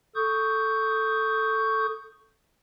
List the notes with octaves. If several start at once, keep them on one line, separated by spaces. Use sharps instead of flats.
A4 C#6 D#6 G6